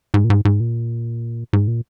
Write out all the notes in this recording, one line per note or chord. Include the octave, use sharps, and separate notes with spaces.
G#2
A#2
G#2
G#2
A#2
G#2
A#2